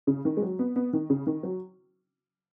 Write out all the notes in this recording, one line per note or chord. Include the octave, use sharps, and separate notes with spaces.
C#3
D#3
G#3
F#3
B3
B3
D#3
C#3
D#3
F#3